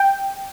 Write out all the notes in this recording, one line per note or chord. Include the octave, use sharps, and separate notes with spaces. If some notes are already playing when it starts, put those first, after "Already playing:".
Already playing: G5